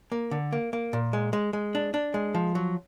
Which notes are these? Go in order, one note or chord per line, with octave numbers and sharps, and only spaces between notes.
A#3
D3
A#3
A#3
A#2
G#3
G#3
G#3
D4
D4
G#3
F3
F#3